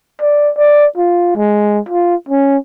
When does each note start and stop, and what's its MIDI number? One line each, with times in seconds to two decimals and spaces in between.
0.21 0.51 74
0.57 0.87 74
0.97 1.32 65
1.36 1.80 56
1.89 2.15 65
2.29 2.57 61